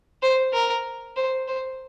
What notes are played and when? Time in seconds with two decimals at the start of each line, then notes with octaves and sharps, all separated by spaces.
0.22 C5
0.53 A#4
1.17 C5
1.48 C5